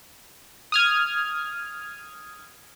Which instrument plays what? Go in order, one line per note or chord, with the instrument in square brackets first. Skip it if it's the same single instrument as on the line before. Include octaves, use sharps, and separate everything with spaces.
[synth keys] D#6 F6 G#6